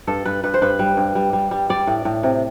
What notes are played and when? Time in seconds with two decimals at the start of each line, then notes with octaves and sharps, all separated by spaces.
0.07 G2 A4
0.25 G2 B4
0.44 G2 B4
0.54 C5
0.62 G2 B4
0.79 G3
0.97 G2
1.15 G3
1.33 G3
1.51 G3
1.69 G3 D5
1.87 A2
2.05 A2
2.23 C3